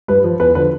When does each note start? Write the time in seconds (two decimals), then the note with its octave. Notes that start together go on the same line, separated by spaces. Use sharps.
0.08 G2 B4
0.24 F3
0.40 E2 B4
0.55 D3 F3 B4